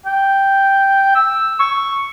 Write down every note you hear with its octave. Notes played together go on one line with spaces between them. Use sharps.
G5
E6
C#6